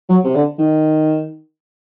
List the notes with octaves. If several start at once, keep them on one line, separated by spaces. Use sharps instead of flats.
F#3
C3
D3
D#3